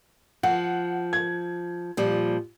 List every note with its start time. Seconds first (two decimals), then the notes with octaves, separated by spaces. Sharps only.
0.43 F3 F#5
1.13 G#6
1.97 A#2 F3 G3